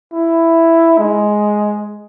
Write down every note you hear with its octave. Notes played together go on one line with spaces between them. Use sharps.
E4
G#3